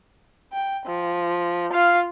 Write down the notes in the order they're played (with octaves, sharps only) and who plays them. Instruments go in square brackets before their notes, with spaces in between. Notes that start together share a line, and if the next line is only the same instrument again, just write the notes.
[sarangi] G5
F3
[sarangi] F4 [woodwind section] F5